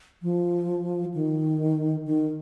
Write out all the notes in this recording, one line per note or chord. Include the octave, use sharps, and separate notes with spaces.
F3
D#3
D#3